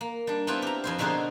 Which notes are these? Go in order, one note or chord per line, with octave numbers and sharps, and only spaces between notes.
A#3
G3 D4
B3 C4 E4 F4 G4 B4
G4 A#5
F2 E4 C5
B2 D3 D#4 F#4 G#4 C5